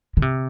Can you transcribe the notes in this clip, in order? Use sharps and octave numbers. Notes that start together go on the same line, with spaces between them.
D3
C3